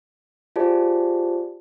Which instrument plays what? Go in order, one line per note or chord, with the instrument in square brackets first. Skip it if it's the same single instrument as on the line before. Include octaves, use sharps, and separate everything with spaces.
[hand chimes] F4 G4 G#4 C5 D5 A5